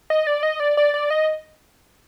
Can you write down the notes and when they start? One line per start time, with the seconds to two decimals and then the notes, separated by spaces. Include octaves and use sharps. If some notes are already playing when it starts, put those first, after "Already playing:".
0.10 D#5
0.27 D5
0.43 D#5
0.60 D5
0.77 D5
0.94 D5
1.10 D#5